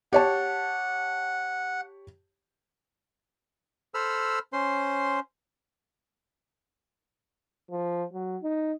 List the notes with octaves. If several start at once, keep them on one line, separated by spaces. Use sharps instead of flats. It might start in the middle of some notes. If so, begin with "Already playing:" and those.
G4 C#5 F#5 A5
A4 C5 B5 E6 F6
C#4 C5 C6
F3
F#3
D#4